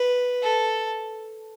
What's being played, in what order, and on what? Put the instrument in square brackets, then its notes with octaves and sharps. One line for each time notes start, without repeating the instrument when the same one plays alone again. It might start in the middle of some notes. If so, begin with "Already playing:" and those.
Already playing: [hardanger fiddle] B4
A4